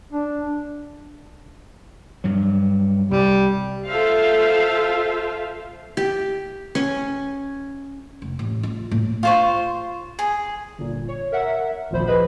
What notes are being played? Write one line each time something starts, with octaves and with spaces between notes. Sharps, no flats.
D4
G2 F#3
C2 G3
F4 A4 C5 E5 F5
G4
C#4
F1
A1
F4
A2
F4 C5 C#6
G#4
G1 A#2
C#5
A#4 E5 F#5
G#1 D2 A#2 F3 C5 B5
G#4 B4 D#5 B5